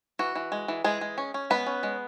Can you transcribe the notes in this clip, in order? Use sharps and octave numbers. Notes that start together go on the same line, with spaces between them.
E3 F#4
E3
G#3
E3
E3 G#3 G#4
G#3
C#4
C#4
G#3 B3 B4
C#4
G#3